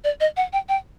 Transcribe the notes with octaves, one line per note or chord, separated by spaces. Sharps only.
D5
D#5
F#5
G5
G5